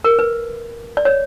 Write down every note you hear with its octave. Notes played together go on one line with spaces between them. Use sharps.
A#4
B4
D5
C#5